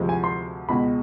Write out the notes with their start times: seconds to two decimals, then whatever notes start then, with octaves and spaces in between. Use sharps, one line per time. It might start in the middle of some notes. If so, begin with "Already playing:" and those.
Already playing: D2 C3 F3 G#3
0.09 G#5
0.24 C6
0.69 C#2 B2 G#3 B5